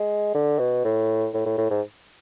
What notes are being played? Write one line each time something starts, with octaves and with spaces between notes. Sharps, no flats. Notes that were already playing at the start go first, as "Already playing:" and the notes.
Already playing: G#3
D3
B2
A2
A2
A2
A2
G#2